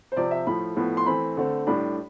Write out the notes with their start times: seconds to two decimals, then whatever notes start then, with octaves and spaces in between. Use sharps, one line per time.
0.12 C5
0.16 C3 F3 C4 D5
0.31 E5
0.47 A2 F3 A3 B5
0.77 A2 F3 B3
0.97 C6
1.06 E3 A3 C4 B5
1.37 D3 A3 C4
1.67 A2 G3 D4 B5